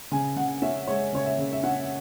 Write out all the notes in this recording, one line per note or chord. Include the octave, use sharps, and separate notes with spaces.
C#3 G#5
C#3 F#5
C#4 E5
G#3 C#5
C#3 C#5
E5
C#3
E5
C#4 F#5